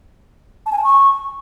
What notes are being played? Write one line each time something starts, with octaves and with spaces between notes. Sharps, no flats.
A5
G#5
A5
C#6